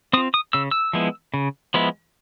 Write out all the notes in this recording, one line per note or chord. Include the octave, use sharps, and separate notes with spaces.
C4 F4 D#6
D#6
C#3 E6
E6
F3 G#3 B3 E4
C#3
F3 G#3 B3 E4